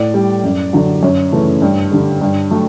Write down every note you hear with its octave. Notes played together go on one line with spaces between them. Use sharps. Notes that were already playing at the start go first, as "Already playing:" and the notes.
Already playing: A2 D5
G3
F#2
D3 F#3
F#2 C#5
C#3 E3 A3
G2
D3 G3
G2
F#3 A3